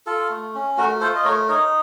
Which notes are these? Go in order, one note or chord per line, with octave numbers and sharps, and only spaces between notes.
F4 A4
A3
C#4
A3 F#4 A#4
F4 A4 C5
D#5
A3 A#4 C#5
D#4 A#4 C#5